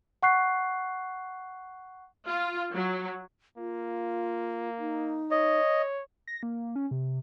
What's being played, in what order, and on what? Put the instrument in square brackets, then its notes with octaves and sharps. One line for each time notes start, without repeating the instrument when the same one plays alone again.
[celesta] F#5 C#6 F#6 C7
[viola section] F4
F#3
[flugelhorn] A#3 [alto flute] F4
[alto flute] D#4
[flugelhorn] C#5 [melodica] D#5
[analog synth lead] A#6
A#3
C#4
C3